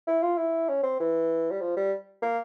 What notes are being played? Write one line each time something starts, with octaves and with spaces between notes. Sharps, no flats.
E4
F4
E4
C#4
C4
E3
G3
F3
G3
A#3